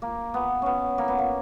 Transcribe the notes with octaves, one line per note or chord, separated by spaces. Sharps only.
A#3
B3
B3 C#4
A#3
B3
A#3